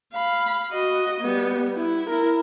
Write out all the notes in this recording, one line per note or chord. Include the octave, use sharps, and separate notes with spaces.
F5 B5
F#4 D#5
G3 B3
E4
E4 A#4